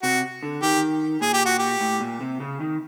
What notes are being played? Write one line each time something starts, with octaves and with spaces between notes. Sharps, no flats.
C3 F#4
D3
D#3 G4
A#2 G#4
G4
F#4
G4
A2
A#2
C3
C#3
D#3